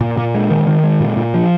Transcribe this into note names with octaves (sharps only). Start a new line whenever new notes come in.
A#2
A#2
G#3
D#3
D#3
G#3
A#2
A#2
F3